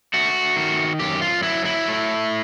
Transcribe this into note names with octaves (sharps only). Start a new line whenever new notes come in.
A3 F#4
D#3
F#2 G4
F4
F#3 E4
E4
A3